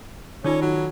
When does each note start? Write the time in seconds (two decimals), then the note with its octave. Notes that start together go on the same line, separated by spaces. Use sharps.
0.44 D#3 C#4 D#4 F4
0.62 F#3